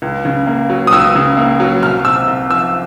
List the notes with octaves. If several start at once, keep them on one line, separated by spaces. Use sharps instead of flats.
C#2
C#3
A#3
F#3
D#6
C#2 E6
C#3
A#3
F#3
C2 F6
C3 E6
C2
F3 E6